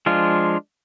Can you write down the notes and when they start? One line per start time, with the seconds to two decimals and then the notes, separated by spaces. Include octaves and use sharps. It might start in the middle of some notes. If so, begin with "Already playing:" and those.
0.06 F3 G#3 D4 F4